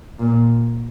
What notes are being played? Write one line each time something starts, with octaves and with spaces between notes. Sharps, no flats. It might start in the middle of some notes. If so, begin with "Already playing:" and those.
A#2